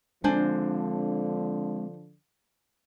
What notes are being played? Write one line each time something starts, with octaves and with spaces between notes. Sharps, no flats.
D3 F3 G#3 C4 D4 C5 G#5